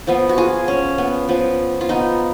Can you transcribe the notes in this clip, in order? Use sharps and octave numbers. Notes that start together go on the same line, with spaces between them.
F3 B3
F#4
F4 G#4
C#4
B3
F3 B3
F4
B3 D#4